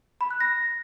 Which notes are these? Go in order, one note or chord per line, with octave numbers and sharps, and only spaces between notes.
B5
F#6
A#6